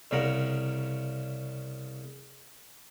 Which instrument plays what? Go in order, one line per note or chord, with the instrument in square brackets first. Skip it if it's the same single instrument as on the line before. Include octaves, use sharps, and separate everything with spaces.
[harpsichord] C2 C#3 A#4 F#5